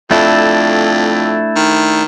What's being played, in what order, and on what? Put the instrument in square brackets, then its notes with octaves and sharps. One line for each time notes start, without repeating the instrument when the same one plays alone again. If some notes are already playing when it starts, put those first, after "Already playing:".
[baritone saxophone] F2 [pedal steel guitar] A3 D4 E4
[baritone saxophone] D#3